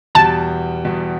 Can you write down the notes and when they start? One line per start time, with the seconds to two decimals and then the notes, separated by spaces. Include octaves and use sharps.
0.15 E2 B2 G3 A5
0.85 E2 B2 G3